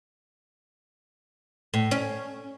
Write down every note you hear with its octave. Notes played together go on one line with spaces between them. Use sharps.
A2
C#4